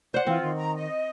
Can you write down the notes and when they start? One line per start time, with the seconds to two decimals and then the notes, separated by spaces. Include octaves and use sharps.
0.14 C5 D5 F#5
0.27 E3 C4 F4
0.43 D#3
0.57 A#5
0.74 D#5